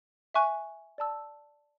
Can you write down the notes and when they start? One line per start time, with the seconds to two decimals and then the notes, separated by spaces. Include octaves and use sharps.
0.34 E5 G#5 C#6 F#6
0.98 D5 A5 E6